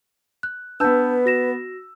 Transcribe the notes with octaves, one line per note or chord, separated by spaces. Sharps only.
F#6
B3 D4 B4 A5 E6 G6
F#4 A#6 E7